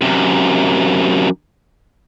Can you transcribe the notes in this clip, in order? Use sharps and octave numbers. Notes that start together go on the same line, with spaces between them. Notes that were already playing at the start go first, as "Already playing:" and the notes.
F#2 C3